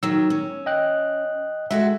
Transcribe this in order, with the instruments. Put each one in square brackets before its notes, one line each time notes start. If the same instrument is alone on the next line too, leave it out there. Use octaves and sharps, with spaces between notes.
[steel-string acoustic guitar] D#3 F#3 [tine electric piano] E6
[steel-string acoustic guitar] C#4
[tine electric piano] D#5 G5 F#6
[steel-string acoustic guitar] G#3 F#4 A4 [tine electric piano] E5